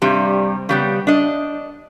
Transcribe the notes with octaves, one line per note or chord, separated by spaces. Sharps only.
G2 C3 G3
C#3 G3 B3
D4 D#5